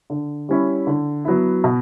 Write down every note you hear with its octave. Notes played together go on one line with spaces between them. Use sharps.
D3
G3 C#4 E4
D3
F#3 B3 E4
B2